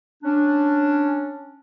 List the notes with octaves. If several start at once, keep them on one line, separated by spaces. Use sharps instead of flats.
C#4 D4